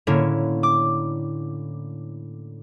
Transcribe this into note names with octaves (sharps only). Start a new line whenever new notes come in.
A2 D3 A#3 C#4 E4
D6